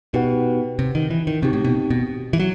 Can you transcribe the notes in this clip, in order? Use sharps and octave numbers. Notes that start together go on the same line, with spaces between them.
B2 D#4 G4 B4 F#5
C3
D#3
E3
D#3
C3 C4 D#4 G4
A2
B2
B2
E3
F#3